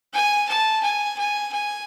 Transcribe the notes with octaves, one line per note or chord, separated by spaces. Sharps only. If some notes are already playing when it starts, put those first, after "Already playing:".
G#5
A5
G#5
G#5
G#5